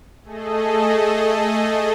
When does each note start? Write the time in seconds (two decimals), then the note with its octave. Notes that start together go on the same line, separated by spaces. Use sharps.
0.24 A3 G#4 A4 D#5